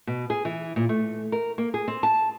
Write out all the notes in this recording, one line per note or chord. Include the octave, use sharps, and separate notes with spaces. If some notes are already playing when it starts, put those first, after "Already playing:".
B2
G#4
E3
A#2
A3
A#4
A#3
G#4
C4
A5